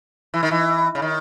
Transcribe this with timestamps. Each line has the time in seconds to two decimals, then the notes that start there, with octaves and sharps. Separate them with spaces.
0.34 E3
0.43 D#3
0.51 E3
0.95 C#3
1.02 D#3